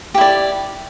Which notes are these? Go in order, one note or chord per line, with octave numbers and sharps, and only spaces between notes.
E4 G4 D5